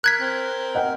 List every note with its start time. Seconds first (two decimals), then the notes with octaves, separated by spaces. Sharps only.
0.04 A#4 F#6 G#6 B6
0.21 C4
0.75 D#5 F#5 G5